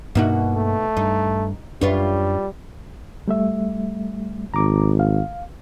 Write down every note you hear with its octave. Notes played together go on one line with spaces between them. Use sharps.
G2 B2 A#3 D#4 F#4
A3
G2 D#4
F#2 G3 D4 F4 B4 C#5
G3 A3 E5
G#1 A#5 D6
F5